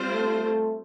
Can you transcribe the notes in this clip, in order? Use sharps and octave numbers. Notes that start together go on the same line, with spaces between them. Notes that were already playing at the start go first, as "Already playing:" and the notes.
Already playing: G3 C4 F4 C5
A3
A3